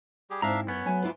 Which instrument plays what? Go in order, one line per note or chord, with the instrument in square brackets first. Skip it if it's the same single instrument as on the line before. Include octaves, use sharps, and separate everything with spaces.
[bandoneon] G3 G4 G#4
[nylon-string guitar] G#2 C4 E4 [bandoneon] D4 E5 F5 [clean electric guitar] A#5
[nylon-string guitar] F#2 [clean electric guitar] B3 [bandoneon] C#4 C#5
[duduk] F#3 [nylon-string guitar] A3 G#5
[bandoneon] D2 [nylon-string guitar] E4 F4 B4